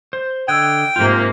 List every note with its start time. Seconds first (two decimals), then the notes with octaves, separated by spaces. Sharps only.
0.13 C5
0.48 D3 D#5 G5 E6 F#6 G#6
0.96 G#2 C3 A#3 F4 G6